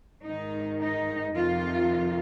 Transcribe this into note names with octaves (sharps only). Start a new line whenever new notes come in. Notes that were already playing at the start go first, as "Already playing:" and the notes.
G#2 D#3 D#4
D#4
F2 C3 D#3 F4